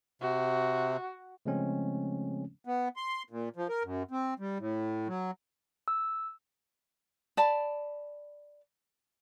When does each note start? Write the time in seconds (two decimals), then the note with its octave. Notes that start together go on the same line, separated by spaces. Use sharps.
0.22 C3 F#4
1.45 C#3 F3 G#3 A3 C4 C#4
2.65 B3
2.96 C6
3.30 A#2
3.56 F3
3.69 A#4
3.84 F#2
4.11 C4
4.39 G3
4.59 A2
5.08 F#3
5.88 E6
7.37 D5 A5 B5